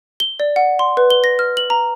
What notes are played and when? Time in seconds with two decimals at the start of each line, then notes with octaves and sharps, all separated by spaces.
0.20 G7
0.40 D5
0.56 F#5
0.79 C6
0.97 B4
1.10 G7
1.24 A#6
1.39 F6
1.57 F#7
1.70 A#5